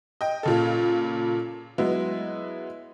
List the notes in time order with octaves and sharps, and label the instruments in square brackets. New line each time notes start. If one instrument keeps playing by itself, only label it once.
[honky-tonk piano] D#5 G5
A#2 C#3 A4
F#3 G#3 B3 E4